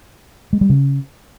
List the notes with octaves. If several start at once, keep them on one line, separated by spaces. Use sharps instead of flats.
G#3
G3
C#3